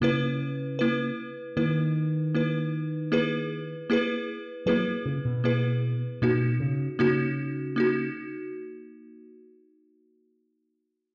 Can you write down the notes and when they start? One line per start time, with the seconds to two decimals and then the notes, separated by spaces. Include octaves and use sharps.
0.01 C#3 A#3 E4 B4
0.79 A#3 E4 B4
1.57 D#3 A#3 E4 B4
2.35 A#3 E4 B4
3.12 A#3 E4 G#4 B4
3.90 A#3 E4 G#4 B4
4.66 F#3 A#3 E4 G#4 B4
5.05 C#3
5.25 B2
5.44 A#3 E4 G#4 B4
6.22 B2 A#3 D#4 F#4
6.60 C#3
6.99 C#3 A#3 D#4 F#4
7.76 A#3 D#4 F#4